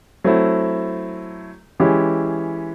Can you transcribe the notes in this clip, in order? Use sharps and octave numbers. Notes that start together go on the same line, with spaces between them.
F#3 A3 C4 E4
E3 G#3 C#4 E4 G4